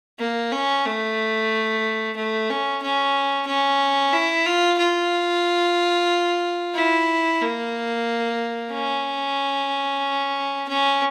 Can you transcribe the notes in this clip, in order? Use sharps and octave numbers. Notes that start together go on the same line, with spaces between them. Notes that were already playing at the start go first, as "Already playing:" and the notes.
A#3
C#4
A3
A3
C#4
C#4
C#4
E4
F4
F4
E4
A#3
C#4
C#4